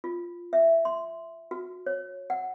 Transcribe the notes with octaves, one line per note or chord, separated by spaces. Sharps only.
F4
E5
C6
F#4
C#5
F#5